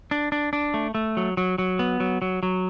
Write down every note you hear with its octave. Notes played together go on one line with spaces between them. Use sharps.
D4
D4
D4
A3
A3
F#3
F#3
F#3
B3
F#3
F#3
F#3